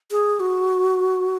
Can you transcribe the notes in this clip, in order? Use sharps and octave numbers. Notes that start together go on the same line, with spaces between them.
G#4
F#4